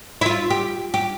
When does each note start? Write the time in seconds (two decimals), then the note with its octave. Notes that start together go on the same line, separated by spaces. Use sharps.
0.21 E4
0.26 F4
0.50 G4
0.94 G4